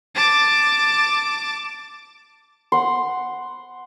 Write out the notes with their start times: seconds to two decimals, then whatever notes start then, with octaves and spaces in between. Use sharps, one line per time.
0.15 A5 D6
2.72 F#5 C6